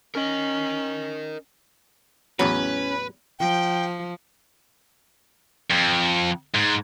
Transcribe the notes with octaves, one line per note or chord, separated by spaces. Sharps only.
C#4 A#4 D#5
A1 E2 F#3 C#4 B4
F3 G5
F2
G#2